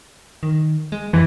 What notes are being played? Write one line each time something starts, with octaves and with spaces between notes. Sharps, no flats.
D#3
G#3
F2 E3